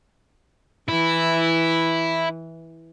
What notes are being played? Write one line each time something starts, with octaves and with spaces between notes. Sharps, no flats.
E3 E4